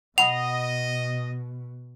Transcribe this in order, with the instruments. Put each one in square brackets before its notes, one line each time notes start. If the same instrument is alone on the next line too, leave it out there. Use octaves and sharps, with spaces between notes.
[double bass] B2 [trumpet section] D#5 [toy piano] F#5 B5 [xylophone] F7